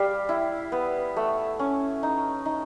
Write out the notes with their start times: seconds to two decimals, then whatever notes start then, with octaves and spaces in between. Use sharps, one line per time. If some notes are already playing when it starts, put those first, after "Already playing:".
Already playing: G3 F5
0.29 E4
0.72 B3
1.16 A3
1.59 C#4
2.03 D#4
2.46 D#4